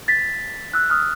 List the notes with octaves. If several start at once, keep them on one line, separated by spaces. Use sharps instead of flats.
A6 B6
E6 F#6
D#6 F6